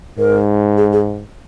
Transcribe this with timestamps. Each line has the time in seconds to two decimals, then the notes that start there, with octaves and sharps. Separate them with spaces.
0.18 G#2 A#4
0.77 G#4
0.93 G#4